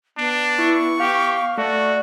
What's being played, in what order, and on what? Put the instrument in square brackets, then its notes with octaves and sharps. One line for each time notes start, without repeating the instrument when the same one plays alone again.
[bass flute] B3 [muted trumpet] D4
[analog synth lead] E4 [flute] C#6
[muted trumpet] G4 [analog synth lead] F5
[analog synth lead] A3 [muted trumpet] F#4 [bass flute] D5